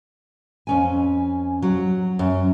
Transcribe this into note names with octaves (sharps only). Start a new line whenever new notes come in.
F2 C#4 G#5
F#3
F#2